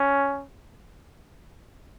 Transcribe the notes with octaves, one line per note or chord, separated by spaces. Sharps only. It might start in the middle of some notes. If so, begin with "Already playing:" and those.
Already playing: C#4